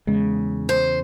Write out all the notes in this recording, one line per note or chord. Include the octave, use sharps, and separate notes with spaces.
E2 C#3 G#3
C5